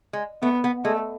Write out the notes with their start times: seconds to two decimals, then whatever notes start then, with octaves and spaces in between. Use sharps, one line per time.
0.13 G#3
0.42 A3 B3
0.64 B3
0.85 G#3 A3